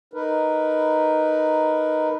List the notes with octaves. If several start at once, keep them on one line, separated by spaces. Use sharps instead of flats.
D#4 A#4 B4